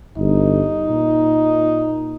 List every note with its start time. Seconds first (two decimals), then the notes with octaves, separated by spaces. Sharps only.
0.18 G1 D#4
0.88 A#2